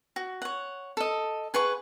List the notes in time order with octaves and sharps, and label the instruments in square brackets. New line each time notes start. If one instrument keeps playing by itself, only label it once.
[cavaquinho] F#4
C#5 F#5
A4 D#5
G#4 B4 F#5 C#6